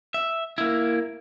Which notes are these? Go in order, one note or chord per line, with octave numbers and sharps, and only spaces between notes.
E5
A#3 E4